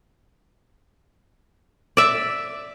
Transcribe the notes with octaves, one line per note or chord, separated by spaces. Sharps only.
D5 E5